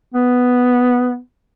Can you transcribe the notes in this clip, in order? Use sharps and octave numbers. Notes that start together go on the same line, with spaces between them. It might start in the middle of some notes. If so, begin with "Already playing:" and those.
B3